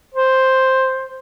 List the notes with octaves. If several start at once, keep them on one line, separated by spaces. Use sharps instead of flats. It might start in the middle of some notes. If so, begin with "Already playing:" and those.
C5